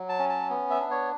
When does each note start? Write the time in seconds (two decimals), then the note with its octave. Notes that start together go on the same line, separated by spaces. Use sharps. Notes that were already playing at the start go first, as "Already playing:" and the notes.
Already playing: F#3
0.09 A5
0.19 C#4
0.29 A5
0.50 B3
0.70 E5
0.81 D4
0.91 C#5